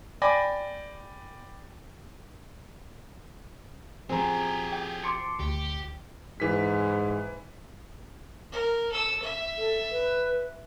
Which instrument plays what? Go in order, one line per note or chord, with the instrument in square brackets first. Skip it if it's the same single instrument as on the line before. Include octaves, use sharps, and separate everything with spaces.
[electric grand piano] D5 G5 G#5 B5 D6 A#6
[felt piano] F3 C4 [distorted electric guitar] G4 G#4 [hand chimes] G#5 A#5
[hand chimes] G5
[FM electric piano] A5 C6 D6 [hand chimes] C#7
[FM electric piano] D2 [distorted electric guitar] G4
[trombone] G#2 [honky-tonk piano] E3 B6
[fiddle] A#4
A4 E6
E5
[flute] A4
B4